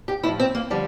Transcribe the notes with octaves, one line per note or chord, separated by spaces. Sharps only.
G4
A2 F3 E4
C4
A#3
D3 F3 G3